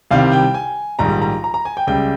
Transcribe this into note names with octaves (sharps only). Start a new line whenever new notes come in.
C2 C3 D#3 G3 F5
G5
G#5
A#1 G#2 D#3 G3 A#5
A#5
A#5
A#5
G#5
G5
C#2 C#3 G3 G5